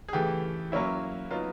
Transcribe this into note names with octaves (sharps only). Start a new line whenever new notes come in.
G#4
C#3 E3 A3 G4
F#3 A#3 C#4 E4
F#3 B3 D#4 F4